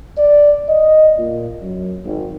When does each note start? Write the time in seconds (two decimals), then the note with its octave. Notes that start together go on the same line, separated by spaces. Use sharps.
0.18 D5
0.69 D#5
1.18 A#2
1.62 F#2
2.05 G#1